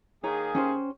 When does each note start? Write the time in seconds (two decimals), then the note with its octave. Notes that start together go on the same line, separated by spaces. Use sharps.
0.24 D#3 A#3 G#4 C#5 A#5
0.55 C#4 G4 C5